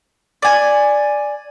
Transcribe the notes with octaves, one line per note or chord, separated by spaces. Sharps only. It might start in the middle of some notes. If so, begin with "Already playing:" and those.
D5 G#5